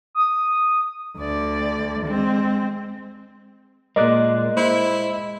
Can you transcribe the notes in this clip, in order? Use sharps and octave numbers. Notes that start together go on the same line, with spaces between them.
D#6
D2 D5
G#3 C4
A#2 G#3 A#4 D5 D#5 F#6
G#3 E4 C5